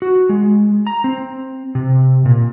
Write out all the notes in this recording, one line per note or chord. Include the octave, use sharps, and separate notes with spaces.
F#4
G#3
A#5
C4
C3
A#2